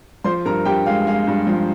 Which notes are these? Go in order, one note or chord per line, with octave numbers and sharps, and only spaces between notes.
F3 C5 C6
G2 A#4 A#5
G2 G4 G5
G#3 F5
G#3 F5
G2
F3